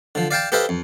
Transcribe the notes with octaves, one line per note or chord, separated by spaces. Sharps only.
D3 F3
D5 F5 G5 A5
G4 A4 B4 C5 D#5 F5
F2